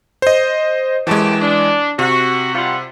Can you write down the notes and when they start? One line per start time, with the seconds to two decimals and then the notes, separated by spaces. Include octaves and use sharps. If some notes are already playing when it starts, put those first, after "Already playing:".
0.22 C5 D#5
1.07 F#2 E3 G#3 G4 A5
1.41 D4
1.99 C3 F#4
2.55 G3 F4 F#5